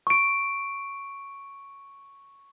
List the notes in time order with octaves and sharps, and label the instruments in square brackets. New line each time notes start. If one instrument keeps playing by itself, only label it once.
[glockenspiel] C#6 D7